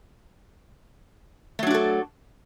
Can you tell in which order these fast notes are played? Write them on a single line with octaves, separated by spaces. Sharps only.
A3 F#3 D4 F#4 A4